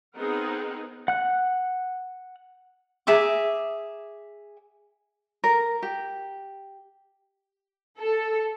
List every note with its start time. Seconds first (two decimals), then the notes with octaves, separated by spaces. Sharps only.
0.16 B3 C4 D#4 G#4 A#4 F#5
1.08 F#5 F#6
3.07 G#4 E5 A#5 D6
5.44 A#4
5.82 G4
8.00 A4